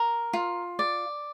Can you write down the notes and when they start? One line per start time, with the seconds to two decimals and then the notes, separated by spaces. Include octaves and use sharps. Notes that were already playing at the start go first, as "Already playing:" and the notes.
Already playing: A#4
0.33 F4
0.79 D5